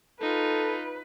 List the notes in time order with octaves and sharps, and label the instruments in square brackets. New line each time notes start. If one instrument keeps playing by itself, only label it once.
[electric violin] D#4 F4 [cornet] A4 [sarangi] B4